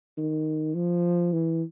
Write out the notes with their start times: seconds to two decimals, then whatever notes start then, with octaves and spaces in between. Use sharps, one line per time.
0.18 D#3
0.75 F3
1.33 E3